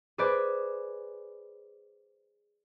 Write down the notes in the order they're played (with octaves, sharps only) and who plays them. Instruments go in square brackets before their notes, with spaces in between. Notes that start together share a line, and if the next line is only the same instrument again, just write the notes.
[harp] G#4 B4 C5 D5